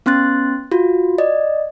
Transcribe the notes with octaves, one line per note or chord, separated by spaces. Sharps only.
B3 C#4 C6 F#6 A6
F4 F#4
D5 D#5